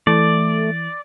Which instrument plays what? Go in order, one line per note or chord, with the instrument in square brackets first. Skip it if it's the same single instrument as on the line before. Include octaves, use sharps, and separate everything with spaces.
[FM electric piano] E3 [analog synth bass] A3 [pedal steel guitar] D5